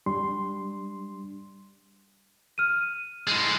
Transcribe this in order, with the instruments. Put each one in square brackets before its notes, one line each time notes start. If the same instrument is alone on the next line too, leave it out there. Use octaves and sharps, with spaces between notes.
[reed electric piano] G3 D4 C6
[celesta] F6 D#7
[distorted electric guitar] A2 G#3